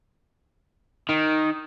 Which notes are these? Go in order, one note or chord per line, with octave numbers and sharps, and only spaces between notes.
D#3